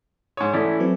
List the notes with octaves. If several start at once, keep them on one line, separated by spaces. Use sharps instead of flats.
G#2 C#5 D#6
E3 A3 C#4 E4 D5
F#3 C4 B4